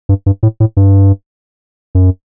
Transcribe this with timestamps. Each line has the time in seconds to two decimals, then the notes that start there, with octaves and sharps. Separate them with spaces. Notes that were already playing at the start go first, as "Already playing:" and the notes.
0.09 G2
0.26 G2
0.43 A2
0.60 A2
0.77 G2
1.95 F#2